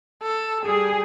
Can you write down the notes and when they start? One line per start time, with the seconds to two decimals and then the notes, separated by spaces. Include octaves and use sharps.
0.23 A4
0.66 G3 G#4